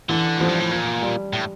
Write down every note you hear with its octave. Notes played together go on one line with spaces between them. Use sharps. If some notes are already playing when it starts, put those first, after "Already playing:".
D3 E3
F2 F3
G2
A2
A#2
G3
A2